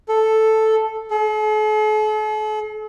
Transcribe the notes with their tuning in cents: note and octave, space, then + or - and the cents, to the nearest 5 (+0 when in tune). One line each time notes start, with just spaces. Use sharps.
A4 +0
A4 -45